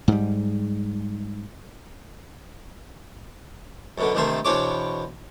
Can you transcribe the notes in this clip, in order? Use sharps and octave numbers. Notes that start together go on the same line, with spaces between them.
G#2 G3
F#2 B2 D3
D2 G2 C3 D#3 A3 C6
E2 B2 C4 D4 C#5 D6